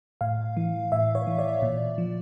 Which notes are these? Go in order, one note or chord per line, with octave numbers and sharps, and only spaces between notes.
A2 F5
E3
A2 E5
C#5
E3
D5
A#2
F3